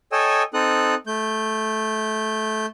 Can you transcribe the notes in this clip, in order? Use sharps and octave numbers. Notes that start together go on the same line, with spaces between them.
A4 C#5 D#5 G5 G#5 E6
C4 D#4 A4 D#6 F#6
A3 G6